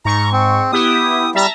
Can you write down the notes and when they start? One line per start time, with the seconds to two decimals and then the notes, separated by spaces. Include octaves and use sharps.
0.05 G#2 A#5 C#6
0.32 C4
0.72 B3 E4 G4 D#6
1.35 G3 E5 A5 A#5